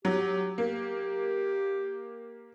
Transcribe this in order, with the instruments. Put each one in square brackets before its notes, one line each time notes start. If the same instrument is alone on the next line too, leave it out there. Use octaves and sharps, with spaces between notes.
[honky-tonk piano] F#3 [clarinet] G4
[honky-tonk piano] A#3 [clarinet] G4